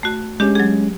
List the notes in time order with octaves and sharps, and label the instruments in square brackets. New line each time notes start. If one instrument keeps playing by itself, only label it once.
[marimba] A3 F#4
[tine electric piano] G#3 C#4 [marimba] D4 G4
[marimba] F#3 G#4